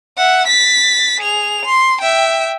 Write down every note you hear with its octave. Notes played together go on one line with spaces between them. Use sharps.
E5 F#5
A6 B6
G#4 F7
C6
E5 G5